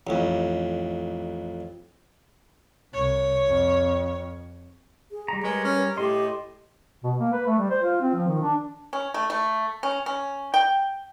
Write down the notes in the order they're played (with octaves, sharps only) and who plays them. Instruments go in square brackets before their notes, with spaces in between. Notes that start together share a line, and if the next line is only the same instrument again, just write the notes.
[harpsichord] A1 F2
[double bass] C2 [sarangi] C#5
[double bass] F2
[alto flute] G#4
[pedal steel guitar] G3 A#5
[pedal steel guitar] G3 A#4 C#5 [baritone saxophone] G#3 [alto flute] B4
[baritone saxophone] C#4
[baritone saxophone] A2 [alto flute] G4 [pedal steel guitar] D#5 C6
[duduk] B2
A#3
B4
A3
G3
C5
F4
C4
F3
D#3
D4
[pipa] C#4
A3
A3
C#4
C#4
G5